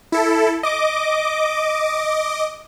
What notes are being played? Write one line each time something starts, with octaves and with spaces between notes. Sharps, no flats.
E4 A4
D#5 D6